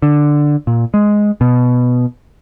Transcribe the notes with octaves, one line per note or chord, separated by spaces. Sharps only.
D3
A#2
G#3
B2